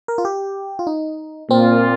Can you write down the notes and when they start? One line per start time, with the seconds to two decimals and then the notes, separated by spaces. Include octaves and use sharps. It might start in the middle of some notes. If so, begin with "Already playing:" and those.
0.08 A#4
0.18 F4
0.25 G4
0.79 F4
0.87 D#4
1.50 A#2 A#3 C4 F4